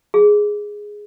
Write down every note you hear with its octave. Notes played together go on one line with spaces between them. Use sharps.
G#4